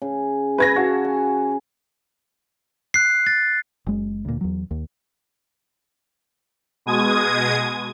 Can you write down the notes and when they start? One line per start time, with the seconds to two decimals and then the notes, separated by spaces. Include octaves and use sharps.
0.02 C#3
0.58 B4 G#6 A#6
0.76 F#4 F5 A5 B5
1.05 G#5
2.94 F#6 C7
3.27 A6
3.87 F#1 G#3
4.25 D2 A#2
4.41 E2 F#3
4.71 D#2
6.86 B2 G#3 D#6 G#6